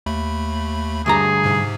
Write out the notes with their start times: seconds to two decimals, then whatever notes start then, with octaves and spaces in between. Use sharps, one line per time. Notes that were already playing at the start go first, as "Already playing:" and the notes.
0.06 D#2 A3 B5
1.06 D2 G2 G#4 A#5
1.43 G#2 C3